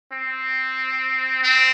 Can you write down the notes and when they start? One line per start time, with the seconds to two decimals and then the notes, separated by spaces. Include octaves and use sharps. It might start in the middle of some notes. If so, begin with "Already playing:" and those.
0.13 C4
1.43 C4